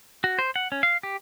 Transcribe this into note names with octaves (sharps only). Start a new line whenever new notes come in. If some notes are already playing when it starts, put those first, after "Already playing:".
F#4
C5
F#5
C#4
F5
G4